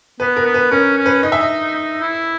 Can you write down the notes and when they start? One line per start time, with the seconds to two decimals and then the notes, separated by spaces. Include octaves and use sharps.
0.20 B3 B4
0.37 A#4
0.45 B3
0.54 B4
0.71 C#4 A#4
0.98 C#4
1.06 B4
1.23 D#4 D#5
1.32 E5
1.41 D#5
1.75 D#4
2.01 E4